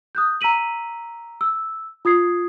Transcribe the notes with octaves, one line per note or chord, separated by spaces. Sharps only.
D#6 F#6 G6
A#5 E6 B6 D#7 F#7
E6
F4 D#6 G#6 C7